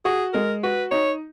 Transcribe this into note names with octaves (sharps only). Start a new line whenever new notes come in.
F#4 G#4
G#3 A#4
F#4 B4
D#4 C#5